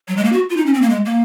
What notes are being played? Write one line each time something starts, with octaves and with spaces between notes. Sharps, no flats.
F#3
G#3
A#3
F#4
F4
D#4
C#4
C4
A#3
G#3
A#3